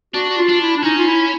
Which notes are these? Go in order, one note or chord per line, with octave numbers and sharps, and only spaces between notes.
D4 F#4
F#4
F4
D4
E4
D4
C#4 D#4
F4
E4